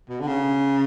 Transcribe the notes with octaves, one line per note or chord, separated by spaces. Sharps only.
B2
D3
C#3